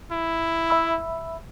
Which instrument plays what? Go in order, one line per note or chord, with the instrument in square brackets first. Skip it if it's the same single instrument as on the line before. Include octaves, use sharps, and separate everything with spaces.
[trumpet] E4
[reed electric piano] E5 B5 E6